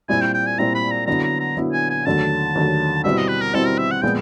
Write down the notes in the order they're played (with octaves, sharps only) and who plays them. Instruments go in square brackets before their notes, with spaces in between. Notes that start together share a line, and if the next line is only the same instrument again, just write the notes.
[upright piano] A#2 G3 C4 E4 [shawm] G#5
[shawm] G5
G5
G#5
[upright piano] A#2 G3 C4 E4 [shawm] A#5
[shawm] B5
A#5
[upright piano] D3 F#3 B3 E4 [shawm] A#5
[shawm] A#5
A#5
[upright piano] D3 F#3 B3 E4
[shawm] G#5
G#5
[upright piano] D#2 D3 F#3 A3 [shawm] A5
[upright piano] D#2 D3 F#3 A3
[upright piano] B2 G3 C4 E4 [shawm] E5
[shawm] D#5
B4
A#4
[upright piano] B2 G3 C4 E4 [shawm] A4
[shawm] A#4
E5
F#5
[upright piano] A#2 F3 G#3 B3 [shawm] G5